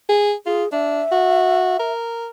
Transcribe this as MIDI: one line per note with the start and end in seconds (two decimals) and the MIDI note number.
0.09 0.34 68
0.46 0.64 65
0.46 0.71 68
0.72 1.02 62
0.72 1.92 76
1.12 1.76 66
1.79 2.28 70